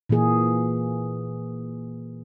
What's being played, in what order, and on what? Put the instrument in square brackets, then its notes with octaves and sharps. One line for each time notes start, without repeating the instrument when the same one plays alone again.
[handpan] A#2 E3 A#3 G#4